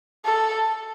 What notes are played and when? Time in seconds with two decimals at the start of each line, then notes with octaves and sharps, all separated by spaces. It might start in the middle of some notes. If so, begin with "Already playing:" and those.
0.25 A4